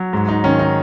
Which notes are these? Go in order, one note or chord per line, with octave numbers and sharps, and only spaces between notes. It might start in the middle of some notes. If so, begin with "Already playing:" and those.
Already playing: F#3
G#2
D#4
D#3 C#4
D#4